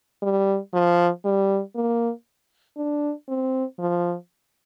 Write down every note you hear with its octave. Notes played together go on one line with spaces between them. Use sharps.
G3
F3
G3
A#3
D4
C4
F3